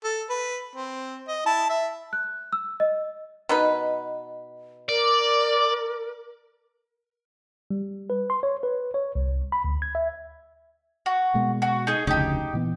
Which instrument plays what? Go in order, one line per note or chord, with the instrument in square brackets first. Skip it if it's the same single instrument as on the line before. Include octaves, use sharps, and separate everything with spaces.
[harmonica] A4
B4
C4
D#5
E4 A5
E5
[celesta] F#6
E6
D#5
[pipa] B2 D#4 B4
[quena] A#4 [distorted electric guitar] D5
[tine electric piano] G3
B4
C6
C#5
B4
C#5
C2
B5
D2
G#6
E5
[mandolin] F#4
[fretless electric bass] B2 G#3 A#3
[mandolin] F#4
D#4 G#4
[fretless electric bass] F1 D2 C#3 [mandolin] D#4 G4
[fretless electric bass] A#2 E3 B3